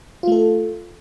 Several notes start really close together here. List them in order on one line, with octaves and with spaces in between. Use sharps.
F4 A3 A4